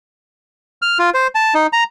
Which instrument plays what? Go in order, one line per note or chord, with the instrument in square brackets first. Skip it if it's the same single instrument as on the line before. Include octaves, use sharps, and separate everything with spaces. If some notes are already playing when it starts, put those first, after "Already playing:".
[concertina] F6
F4
C5
A5
D#4
A#5